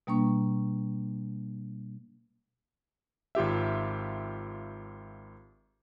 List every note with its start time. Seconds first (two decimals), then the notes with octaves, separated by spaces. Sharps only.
0.07 B2 G3 A#3 D4 C#6
3.35 G#1 F4 G4 E5